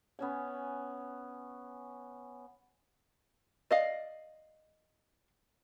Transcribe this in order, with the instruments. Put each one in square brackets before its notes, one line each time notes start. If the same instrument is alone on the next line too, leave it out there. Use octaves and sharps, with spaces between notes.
[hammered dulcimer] B3 C#4 G#5
[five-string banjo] D5 D#5 F5